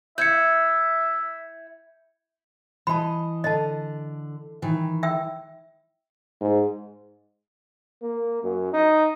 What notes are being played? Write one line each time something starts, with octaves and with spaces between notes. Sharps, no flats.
E4 E5 G6 G#6 C#7
E3 D#5 A5 B5
D3 D#5 A5
D#3 E3
E5 G5 E6
G#2
A#3
F#2
D#4